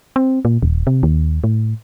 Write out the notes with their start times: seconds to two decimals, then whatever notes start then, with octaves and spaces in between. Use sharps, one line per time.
0.16 C4
0.45 A#2
0.63 D#1
0.87 C3
1.03 D#2
1.44 A2